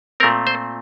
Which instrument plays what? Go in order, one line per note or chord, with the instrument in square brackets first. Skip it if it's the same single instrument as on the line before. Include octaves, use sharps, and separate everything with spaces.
[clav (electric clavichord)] A#2 A3 C4 A#4
C5